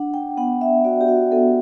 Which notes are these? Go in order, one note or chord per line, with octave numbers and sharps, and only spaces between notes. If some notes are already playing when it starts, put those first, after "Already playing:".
Already playing: D4 F#5
G5
B3 F#5
E5
F#4 D5
G4
F#4
B3 A4